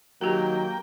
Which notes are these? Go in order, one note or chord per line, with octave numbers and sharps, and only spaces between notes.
D#3 F#3 A#3 G4 A#4 G5